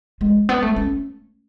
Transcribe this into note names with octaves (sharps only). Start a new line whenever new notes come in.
G#3
B3
A3
C#4